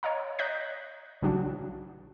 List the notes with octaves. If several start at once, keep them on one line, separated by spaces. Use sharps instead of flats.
C#5 D#5 F5 A#5
C#5 D#5 F#6 G6 A#6 B6
A#1 C#3 F#3 D4 F#4